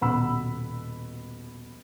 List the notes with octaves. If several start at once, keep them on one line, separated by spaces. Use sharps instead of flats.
D#1 B2 F#5 B5 E6